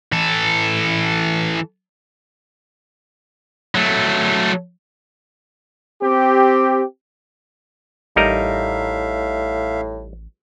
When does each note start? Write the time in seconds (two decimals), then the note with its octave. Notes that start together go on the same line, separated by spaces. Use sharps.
0.12 E3 A4
3.75 F#3 A3
6.02 C4 G4
8.16 A1 A2 G3 D#4 A#4 E5 F5